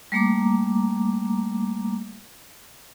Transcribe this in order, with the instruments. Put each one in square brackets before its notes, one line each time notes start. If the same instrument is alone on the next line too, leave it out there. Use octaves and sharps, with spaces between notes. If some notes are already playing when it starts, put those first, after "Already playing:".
[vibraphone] G3 A3 A#3 A#5 D6